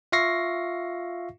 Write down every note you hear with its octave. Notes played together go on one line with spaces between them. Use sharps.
F4 E5 F5 C#6 A#6 C7